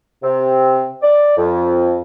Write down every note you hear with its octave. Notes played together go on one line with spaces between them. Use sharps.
C3 C4
D5
F2